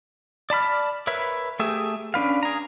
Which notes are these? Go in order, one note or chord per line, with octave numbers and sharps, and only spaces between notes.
D5 A5 B5 F6
A#4 B4 C#5 E5
A3 G4 G#4 E5
C#4 D4 B4 F5
G#4 A#5